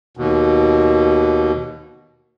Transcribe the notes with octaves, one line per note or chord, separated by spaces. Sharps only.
D#2 B2